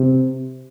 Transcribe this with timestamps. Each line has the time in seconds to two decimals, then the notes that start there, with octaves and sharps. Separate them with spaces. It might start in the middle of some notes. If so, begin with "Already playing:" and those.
Already playing: C3